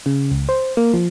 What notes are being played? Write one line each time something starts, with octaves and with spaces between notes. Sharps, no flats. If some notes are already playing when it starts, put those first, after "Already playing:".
C#3
C#2
C5
A#3
F3